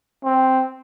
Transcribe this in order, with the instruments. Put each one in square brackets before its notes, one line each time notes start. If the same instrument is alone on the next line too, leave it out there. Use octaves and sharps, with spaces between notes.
[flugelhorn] C4